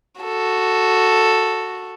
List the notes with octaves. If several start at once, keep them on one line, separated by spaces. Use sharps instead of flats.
F#4 A4